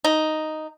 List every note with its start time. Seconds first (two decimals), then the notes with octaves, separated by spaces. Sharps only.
0.04 D#4